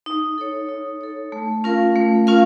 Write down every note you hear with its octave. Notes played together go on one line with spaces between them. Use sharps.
D#4
A4 C#5
D#4
A4 C#5
A3
C#4 F4 A#4 F5
A3
C#4 F4 A#4 F5